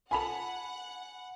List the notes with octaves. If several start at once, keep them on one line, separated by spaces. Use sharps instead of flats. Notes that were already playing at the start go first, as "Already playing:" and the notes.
F4 A4 F#5 G#5 B5 F7